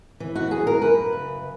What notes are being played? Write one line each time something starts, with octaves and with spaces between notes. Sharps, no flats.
E3
F#4
F#2 G#4
A#4
F#2 B4
C#3